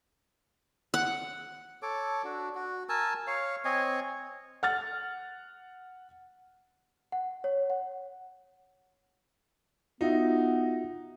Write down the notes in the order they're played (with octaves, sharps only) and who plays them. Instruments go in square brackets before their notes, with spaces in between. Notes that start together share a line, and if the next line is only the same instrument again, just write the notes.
[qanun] F#5
[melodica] A4 C#5 D6
D4 F#4
F#4
A#4 G#5 A5 E6
C#5 F5
C4 C#5 D#5 G#5
[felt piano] F#5 F6 A6
[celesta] F#5
C#5
F#5
[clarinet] B3 [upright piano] D#4 [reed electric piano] F4 F#4 E5